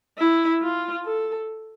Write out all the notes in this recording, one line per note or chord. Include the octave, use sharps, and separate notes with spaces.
E4
F4
A4